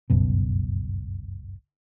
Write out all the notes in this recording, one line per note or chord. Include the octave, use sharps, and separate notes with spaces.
G1 C#2 F#2 B2